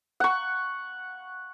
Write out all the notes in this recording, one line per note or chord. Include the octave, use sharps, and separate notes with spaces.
F#5 C#6